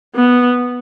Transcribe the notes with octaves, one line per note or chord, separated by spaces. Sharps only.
B3